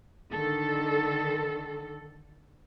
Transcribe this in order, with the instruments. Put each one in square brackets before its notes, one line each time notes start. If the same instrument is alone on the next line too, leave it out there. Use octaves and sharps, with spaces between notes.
[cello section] D3 D#3 A4